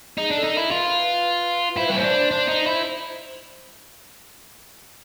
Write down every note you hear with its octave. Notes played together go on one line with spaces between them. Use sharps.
D#4 G#4
D4 A4
D#4
E4 A#4
F4 B4
E4 C5
C4 B4
C#4 C5
D4
D4
D#4
E4